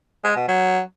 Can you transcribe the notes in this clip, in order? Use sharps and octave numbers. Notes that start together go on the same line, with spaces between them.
G#3
B2
F#3